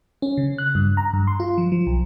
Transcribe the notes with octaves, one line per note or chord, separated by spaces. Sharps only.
C#4
C#3
F#6
G2
A#5
G2
C6
F4
F3
F3
B1